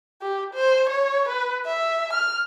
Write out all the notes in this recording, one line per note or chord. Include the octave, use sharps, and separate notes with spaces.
G4
C5
C#5
B4
E5
F6